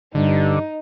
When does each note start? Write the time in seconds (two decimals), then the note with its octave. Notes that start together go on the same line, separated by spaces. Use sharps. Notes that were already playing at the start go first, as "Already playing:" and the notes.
0.15 G2 D3 D#4